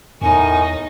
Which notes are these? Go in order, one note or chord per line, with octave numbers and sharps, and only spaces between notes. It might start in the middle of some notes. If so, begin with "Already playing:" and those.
E2 A2 D#3 D#4 G#5 C#6